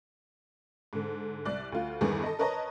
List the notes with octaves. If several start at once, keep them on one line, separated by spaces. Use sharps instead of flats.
G#2 D3
C2 D5 F#6
D2 F4
E2 G2 D3 D#3 G#4 B4
A4 D#5
A#4 B4 C#5 D#5 A5 A#5